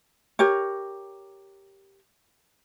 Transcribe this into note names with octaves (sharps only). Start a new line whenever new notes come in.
G4 A#4 C#5